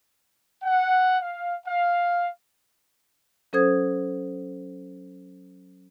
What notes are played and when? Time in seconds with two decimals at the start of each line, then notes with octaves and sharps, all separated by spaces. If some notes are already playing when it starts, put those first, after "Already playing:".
0.62 F#5
1.21 F5
1.66 F5
3.53 F#3 C#4 A4 C5 D#6 G#6